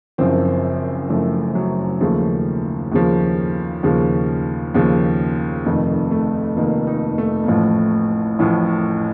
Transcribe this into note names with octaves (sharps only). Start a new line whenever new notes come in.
F#1 F#2 F3 C4
F#1 F#2 F3 A3
F#3
D#2 C#3 F3 A3
D#2 C#3 F3
D#2 C#3 F3
D#2 C#3 F3
F1 F2 D#3 A3
A3
F1 F2 D#3 A#3
D#4
A3
A#3
A1 A2 F3 A3
A1 A2 F3